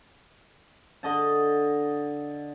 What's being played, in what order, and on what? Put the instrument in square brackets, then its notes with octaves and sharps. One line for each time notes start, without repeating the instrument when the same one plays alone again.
[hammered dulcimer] D3 D#5 A5